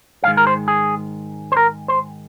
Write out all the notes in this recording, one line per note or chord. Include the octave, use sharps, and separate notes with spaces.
G#2 D#3 G#3 F5
A#4
C5
G#4
C5
A#4
C5